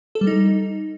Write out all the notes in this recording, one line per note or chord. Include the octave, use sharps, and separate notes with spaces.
A4
G3
D#4